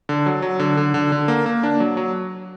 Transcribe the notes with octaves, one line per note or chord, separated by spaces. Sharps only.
D3
F#3
F#3
D3
D3
D3
D3
A#3
A#3
D4
F#3
F#3